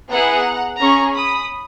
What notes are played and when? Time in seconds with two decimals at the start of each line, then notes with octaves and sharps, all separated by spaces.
0.10 B3 E4 G#4 F#5 A#5
0.79 C#4 G#4 A#5 C#6
1.14 B5 D#6